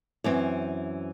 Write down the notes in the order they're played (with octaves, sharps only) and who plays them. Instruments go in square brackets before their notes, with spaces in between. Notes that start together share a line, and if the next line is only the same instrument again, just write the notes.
[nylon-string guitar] F#2 E3 C4